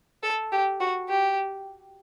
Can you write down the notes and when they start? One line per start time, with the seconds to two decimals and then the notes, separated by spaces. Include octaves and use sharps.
0.23 A4
0.51 G4
0.80 F#4
1.09 G4